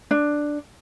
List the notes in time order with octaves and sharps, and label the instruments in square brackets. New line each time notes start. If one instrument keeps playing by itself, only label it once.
[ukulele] D4